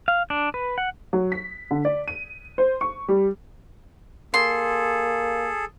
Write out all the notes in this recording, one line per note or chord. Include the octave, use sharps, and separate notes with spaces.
F5
D4
B4
F#5
F#3
B6
D3
D5
D#7
C5
C#6
G3
A#3 G#4 A4 C6